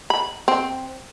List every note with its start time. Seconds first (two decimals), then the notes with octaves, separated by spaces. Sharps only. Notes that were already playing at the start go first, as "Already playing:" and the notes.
0.10 B5
0.48 C4